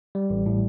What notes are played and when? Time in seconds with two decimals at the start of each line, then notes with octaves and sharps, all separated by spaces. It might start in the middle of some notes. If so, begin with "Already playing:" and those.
0.15 G3
0.30 A1
0.46 A2